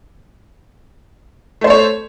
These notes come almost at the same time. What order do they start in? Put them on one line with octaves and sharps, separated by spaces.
A3 C5 A4 C#5